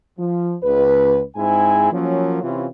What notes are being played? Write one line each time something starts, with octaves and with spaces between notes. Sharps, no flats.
F3
C#2 B4
G#2 C4 E4 G#4 G#5
F3 F#3 A#3 C#4
C3 E3 C4 C#4 E4 F4